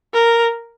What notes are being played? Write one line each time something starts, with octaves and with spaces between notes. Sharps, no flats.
A#4